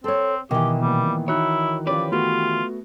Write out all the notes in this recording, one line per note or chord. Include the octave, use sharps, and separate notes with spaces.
C4 A4 C#5
B2 D#3 E3 G4
A#2 G3 B3
D#4 E4 F#4 C#5 F#6
F3 C#4 G4 B4 D5
A3 B3 F4 F#4